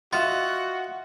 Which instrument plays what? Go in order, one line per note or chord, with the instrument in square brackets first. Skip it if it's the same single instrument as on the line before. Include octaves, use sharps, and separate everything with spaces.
[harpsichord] F4 [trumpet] F#4 [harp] D#5 E5 [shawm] F#5